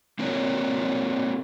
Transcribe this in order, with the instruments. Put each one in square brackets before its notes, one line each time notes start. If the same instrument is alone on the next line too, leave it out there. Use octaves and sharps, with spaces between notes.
[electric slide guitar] A#3 C4 F#4 A#4 C#5 D5